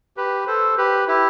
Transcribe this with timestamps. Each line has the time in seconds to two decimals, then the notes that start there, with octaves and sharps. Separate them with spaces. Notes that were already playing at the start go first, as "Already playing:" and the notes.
0.17 G4 B4
0.47 A4 C5
0.77 G4 B4
1.08 E4 G4